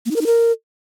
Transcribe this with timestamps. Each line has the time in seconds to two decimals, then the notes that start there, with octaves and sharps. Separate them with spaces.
0.06 A#3
0.11 D#4
0.16 A#4
0.21 D#4
0.26 A#4